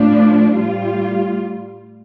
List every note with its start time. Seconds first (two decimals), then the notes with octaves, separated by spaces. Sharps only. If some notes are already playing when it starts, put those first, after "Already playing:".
Already playing: A2 F3 D4
0.53 A2 G3 F4